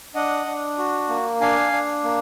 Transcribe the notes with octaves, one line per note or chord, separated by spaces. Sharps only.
D4 D#5 F#5
D4
F#4
A#3
D4 F5 G#5
D4
A#3